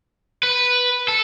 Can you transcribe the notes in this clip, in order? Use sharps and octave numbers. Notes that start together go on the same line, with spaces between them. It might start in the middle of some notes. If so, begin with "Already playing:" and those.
B4
A4